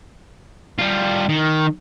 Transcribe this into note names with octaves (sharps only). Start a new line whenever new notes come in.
G3 F4
D#3